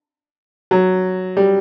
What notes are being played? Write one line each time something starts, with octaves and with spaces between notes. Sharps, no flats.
F#3
G3